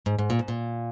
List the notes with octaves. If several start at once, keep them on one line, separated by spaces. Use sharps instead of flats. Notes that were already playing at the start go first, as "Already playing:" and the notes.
G#2
G#2
A#2
G#2
A#2